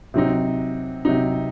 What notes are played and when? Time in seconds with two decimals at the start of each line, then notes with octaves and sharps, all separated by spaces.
0.14 C3 F#3 C4 D#4
1.05 C3 F#3 C4 D#4